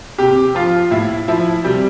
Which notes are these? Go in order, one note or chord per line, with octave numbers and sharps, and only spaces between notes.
C3 G4
F3 F4
A2 E4
F3 E4
C3 G3